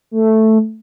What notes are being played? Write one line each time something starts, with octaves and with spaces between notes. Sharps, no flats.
A3